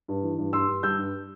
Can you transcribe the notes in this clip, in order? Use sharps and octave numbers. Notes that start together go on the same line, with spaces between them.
G2
E3
G2
G2 C6 E6
G2
G3 E6 G6
G2